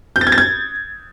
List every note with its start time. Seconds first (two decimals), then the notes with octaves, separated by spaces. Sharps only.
0.16 G6
0.21 A6
0.27 G#6
0.32 A6
0.38 G#6